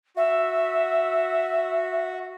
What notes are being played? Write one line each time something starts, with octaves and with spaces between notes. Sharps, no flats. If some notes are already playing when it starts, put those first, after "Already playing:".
F#4 E5